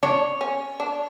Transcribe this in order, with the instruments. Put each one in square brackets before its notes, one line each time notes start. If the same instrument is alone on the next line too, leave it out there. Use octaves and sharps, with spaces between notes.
[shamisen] D4 [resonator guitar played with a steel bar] C#5
[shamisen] C#4
D4